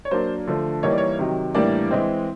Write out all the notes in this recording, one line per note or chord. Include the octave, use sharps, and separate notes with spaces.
C#5
F#3 A#3 D4 C5
D3 F3 A3
E3 G3 A#3 D#4 C#5
D5
C#5
C3 D#3 F#3
A2 E3 G3 A#3 D4 D5
E3 G#3 C4